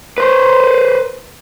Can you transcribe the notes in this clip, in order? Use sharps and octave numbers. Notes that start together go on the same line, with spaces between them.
B4 C5